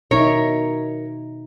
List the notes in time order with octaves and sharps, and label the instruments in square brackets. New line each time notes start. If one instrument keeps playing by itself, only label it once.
[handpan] B2 D#4 E5 [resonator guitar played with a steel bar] A#4 C#5